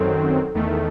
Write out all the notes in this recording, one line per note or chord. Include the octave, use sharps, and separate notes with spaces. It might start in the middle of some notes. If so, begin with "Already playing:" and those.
Already playing: F#2 D#3 F#3 C4 A4
E2 D#3 A3